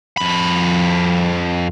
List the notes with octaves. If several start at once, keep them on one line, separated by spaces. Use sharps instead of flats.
F2 B5